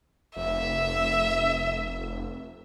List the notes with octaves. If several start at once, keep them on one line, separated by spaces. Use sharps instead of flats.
F1 E5